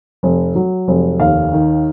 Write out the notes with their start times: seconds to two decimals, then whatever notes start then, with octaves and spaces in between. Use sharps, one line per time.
0.23 F1
0.55 F#3
0.88 F1
1.20 D#2 F5
1.53 D#3